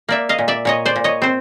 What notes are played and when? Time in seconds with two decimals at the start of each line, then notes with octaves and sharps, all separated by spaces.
0.09 A#3 D5 E5
0.29 D#5 F5
0.39 A#2
0.48 D5 E5
0.65 A#2 C#5 D#5
0.86 C5 D5
0.96 A#2
1.04 C#5 D#5
1.22 C4 C5